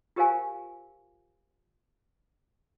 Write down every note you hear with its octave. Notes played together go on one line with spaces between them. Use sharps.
F4 G4 A#4 C5 F5 G#5